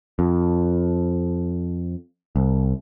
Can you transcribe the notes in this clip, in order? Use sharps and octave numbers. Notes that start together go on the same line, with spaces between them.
F2
C2